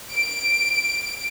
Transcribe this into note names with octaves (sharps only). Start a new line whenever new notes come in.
D7